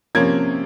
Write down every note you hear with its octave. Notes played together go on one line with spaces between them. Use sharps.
C3 F3 A#3 C#4 G#6